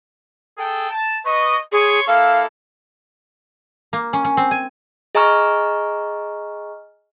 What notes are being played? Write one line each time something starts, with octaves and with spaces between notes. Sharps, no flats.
G#4 A4 G5
A5
B4 D#5 C#6
G#4 C#5 C6 C#6
A#3 E4 A4 F5
A#3
C#4
C#4
C4
G#5
G#4 D#5 G#5 A#5 C#6 F6